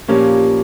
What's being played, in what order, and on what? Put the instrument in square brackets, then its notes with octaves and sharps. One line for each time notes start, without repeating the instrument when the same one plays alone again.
[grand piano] A#2 F3 A#3 C#4 [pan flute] G4